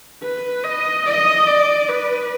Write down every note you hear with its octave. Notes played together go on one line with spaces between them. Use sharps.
B4
D#5
D#5
D5
B4